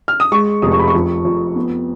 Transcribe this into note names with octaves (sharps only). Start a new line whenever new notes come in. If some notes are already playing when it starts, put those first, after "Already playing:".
F6
D#6
G#3 C#6
F1 D#6
C#6
B5
C#6
F2
F2
B3